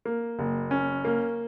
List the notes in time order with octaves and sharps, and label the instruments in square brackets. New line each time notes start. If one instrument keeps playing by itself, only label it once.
[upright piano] A#3
F#1
C#4
A#3